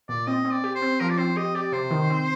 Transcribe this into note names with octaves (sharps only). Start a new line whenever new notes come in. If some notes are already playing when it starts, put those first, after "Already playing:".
A#2 D5
C4 D#5
C4
D5
G4
C5
C4
F3 A#4
D5
C4 C5
G4 D#5
G4 D5
C3 C5
D#3
C4